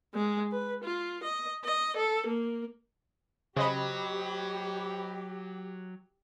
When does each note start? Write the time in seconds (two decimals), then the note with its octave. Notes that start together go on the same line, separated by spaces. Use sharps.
0.15 G#3
0.52 B4
0.84 F4
1.23 D#5
1.64 D#5
1.96 A4
2.26 A#3
3.57 C#3 F#3 G4 C5 D#5 B5